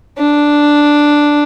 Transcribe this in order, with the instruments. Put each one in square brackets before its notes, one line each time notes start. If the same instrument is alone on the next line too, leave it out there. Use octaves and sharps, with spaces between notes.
[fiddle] D4